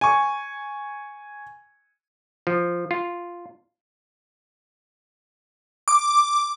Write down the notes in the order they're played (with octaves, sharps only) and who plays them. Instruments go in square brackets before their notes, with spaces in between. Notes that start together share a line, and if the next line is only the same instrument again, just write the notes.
[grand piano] G#5 C#6
[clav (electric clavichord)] F3
F4
[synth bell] D6